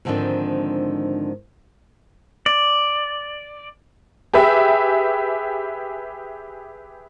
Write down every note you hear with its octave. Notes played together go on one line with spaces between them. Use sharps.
G#2 D3 D#3 F3 C4 D4
D5
G4 G#4 B4 E5